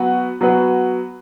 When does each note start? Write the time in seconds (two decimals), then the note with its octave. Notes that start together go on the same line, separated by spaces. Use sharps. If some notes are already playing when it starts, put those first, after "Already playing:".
Already playing: F#3 B3 F#4 B4
0.41 F#3 B3 F#4 B4